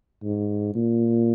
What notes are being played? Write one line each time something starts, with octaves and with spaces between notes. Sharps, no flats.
G#2
A#2